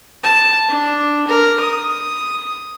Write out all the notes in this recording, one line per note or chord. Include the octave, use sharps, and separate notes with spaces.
A5
D4
A#4
D#6